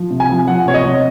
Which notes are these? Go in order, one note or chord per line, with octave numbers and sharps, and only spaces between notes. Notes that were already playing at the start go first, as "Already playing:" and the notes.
Already playing: F3
C3
G#5
F3
F3 F#5
C3 C#5
D#5
C3